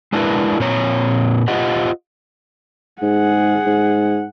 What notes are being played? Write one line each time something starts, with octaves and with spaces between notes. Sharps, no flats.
G#3 D4 E4 A#4 B4
A#2 C4 C#5 A#5
F4 G4 C5 D#5 F#5
G#2 G#4 F#5
G#2